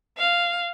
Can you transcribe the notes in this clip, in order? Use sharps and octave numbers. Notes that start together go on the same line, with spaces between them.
F5